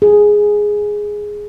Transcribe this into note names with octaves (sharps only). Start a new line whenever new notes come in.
G#4